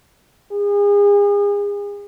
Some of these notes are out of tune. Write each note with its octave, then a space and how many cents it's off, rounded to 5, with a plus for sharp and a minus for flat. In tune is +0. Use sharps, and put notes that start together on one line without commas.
G#4 -35